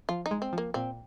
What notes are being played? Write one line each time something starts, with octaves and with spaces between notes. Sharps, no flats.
F3 F4
D#4
G#3
C4
F3 A#3
A#2 C4